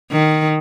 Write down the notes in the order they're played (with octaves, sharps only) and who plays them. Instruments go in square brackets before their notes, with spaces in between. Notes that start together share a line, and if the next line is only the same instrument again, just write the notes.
[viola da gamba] D#3